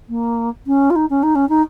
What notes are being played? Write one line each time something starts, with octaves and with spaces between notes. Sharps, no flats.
A#3
C#4
F4
D#4
C#4
D#4
C#4
D#4